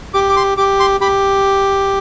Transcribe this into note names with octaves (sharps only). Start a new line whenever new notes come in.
G4 D6
D6
C6
G4 D6
C6
G4 B5